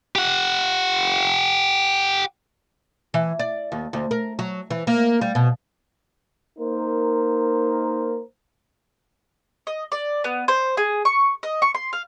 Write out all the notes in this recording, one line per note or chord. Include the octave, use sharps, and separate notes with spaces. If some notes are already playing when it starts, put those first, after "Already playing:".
G4 F#5
E3
D5
D#2
D2
A#4
F#3
E3
A#3
G3
B2
A#3 D#4 A#4 C5
D#5
D5
B3
C5
G#4
C#6
D#5
C#6
C6
F5